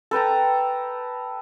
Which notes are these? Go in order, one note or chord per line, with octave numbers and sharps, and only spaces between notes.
A4 B4 G5 A#5